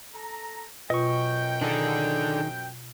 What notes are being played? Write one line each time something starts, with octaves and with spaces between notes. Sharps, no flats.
A4 A#5
F#2 B2 F4 D#5 G5 C#6
D#3 D4 D#4 G#4 A4